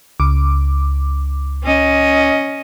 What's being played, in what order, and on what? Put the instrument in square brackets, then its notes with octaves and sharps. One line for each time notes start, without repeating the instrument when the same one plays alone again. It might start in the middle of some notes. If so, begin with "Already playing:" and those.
[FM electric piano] C#2 D6
[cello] C#4 D#5